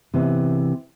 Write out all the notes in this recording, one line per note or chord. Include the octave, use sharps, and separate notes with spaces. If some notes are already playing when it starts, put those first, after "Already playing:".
C3 E3 B3